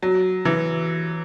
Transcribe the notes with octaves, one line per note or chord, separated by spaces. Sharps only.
F#3
E3